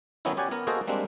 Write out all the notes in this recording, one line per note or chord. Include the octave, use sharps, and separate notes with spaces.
D#3 F#3 B3 C#4 D#4 E4
C#4 G4 D5 F#5 G#5
B3 A#4
A#3 F#4 G#4 A4 C5 D#5
G3 G#3 A#3 C4 D4